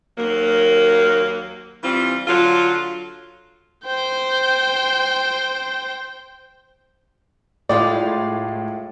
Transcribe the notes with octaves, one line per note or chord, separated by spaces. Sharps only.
D#2 F#3 A#3
E3 G3 C4 F4
D3 F#3 F4
C5 G5
A2 G3 G#3 F4 D5